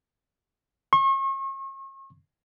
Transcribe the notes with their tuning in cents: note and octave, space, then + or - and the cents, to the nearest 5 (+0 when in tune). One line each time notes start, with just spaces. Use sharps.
C#6 -40